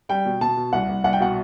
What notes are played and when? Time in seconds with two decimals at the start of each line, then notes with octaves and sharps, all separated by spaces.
0.09 G3 G5
0.25 B2
0.41 B2 A5
0.57 B2
0.73 C2 F#5
0.89 C2
1.04 C2 F#5
1.13 G5
1.20 B2 F#5